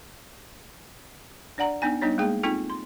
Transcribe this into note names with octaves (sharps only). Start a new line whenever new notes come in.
D4 D5 F#5 A#5
B3 D4 D#4 G#5
G3 B3 D4 D#4 C#5
G#3 A#3 G#4 G5
C4 D#4 F4 A4 G5
C6